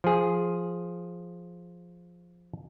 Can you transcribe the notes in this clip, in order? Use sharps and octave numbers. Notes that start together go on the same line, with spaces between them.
F3 G#4